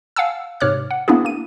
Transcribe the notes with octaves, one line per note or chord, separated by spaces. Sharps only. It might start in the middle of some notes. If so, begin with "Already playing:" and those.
F5 F#5 G#5 A5 E6
G#2 C3 C#5 D6 F6 F#6
F#5
A#3 B3 D4 E4 F#4 G#4
A#3 D#7